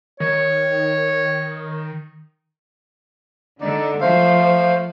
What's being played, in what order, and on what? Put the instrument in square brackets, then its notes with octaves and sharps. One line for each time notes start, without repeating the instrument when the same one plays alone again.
[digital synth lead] D#3 [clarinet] C#5
[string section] D3 [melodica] D#4 D5
[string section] F3 [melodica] A3 C5 F5